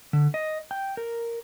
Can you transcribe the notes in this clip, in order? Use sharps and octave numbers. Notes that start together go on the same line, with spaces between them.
D3
D#5
G5
A#4